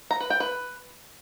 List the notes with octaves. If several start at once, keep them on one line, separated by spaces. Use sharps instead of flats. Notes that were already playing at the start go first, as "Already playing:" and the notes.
A#5
B4
G5
B4